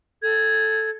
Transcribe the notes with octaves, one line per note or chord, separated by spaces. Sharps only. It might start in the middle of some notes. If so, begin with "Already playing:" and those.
A4 G#6